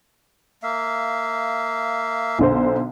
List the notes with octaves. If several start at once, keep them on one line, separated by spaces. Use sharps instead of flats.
A#3 E5 F5
B1 D3 C5